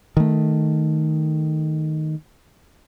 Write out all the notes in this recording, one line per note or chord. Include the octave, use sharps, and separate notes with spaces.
D#3 A3